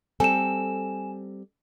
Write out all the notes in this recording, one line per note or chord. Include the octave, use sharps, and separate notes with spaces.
G3 C4 A4 G#5 E7